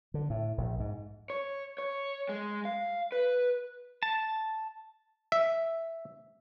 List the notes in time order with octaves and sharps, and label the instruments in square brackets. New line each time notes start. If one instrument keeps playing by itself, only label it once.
[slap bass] D3
A2
A#1
G#2
[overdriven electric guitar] C#5
C#5
G#3
F5
B4
[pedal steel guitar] A5
[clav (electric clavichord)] E5